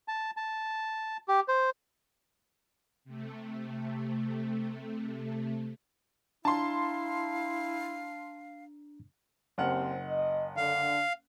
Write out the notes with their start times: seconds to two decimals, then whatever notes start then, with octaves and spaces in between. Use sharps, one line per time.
0.08 A5
0.37 A5
1.28 G4
1.48 C5
3.04 C3 A3
6.45 D4 E4 F5 A5 A#5 C6
9.58 F#1 C4 G4 F#5 F6
10.07 D#5
10.57 D3 F5